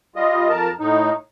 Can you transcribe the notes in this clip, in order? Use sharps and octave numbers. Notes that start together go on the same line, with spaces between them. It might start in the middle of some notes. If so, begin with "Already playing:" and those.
G3 F4 D#5
F2 A#4 A5
A2 D#4